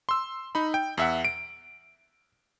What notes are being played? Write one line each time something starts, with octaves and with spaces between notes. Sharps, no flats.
C6 E6
D#4 B5
G5
E2 E5 F#5
D7